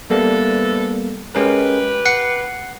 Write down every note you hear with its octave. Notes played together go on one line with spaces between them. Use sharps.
D3 E3 G3 A#3 B3 A4
G#3 C#4 G4 A#4 B4
F#5 C7 C#7